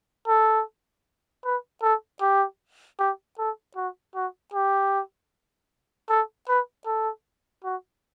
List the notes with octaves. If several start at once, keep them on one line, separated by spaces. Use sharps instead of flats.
A4
B4
A4
G4
G4
A4
F#4
F#4
G4
A4
B4
A4
F#4